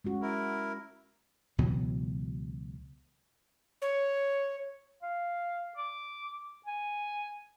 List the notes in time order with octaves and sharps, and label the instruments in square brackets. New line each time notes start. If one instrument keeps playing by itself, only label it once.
[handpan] G#3 C#4 F#4
[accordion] E4 A#4
[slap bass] C#2 B2 E3 F#3
[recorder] C#5
[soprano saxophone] F5
D6
G#5